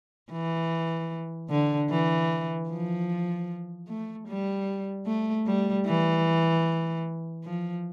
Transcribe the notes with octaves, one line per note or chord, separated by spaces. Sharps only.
E3
D3
E3
F3
A3
G3
A3
G3
E3
F3